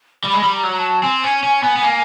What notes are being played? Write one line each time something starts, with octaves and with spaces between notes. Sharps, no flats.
G3 B5
G#3
G3
A#5
F#3
A5
C4 G#5
C#4
C#4
B3
B3
A#3